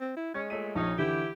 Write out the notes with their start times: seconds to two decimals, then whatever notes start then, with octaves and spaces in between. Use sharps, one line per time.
0.01 C4
0.17 E4
0.34 G#3 C#4 G#6
0.50 A#2 A3 C#5 D#7
0.75 A#1 C#4 D#4
0.98 D3 E3 E4 G4